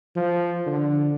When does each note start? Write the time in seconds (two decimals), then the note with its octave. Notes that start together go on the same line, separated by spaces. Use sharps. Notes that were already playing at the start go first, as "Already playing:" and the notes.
0.16 F3
0.67 D3